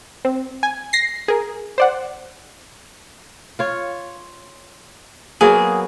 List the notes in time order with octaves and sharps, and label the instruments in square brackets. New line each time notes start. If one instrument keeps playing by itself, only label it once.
[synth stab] C4
G#5
A#6 C7
G#4 A#4
C5 D5 F#5
[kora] F4 C#5
[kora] F#3 A#3 B3 [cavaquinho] G#4